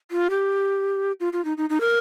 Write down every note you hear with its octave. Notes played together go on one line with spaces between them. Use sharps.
F4
G4
F4
F4
D#4
D#4
D#4
A#4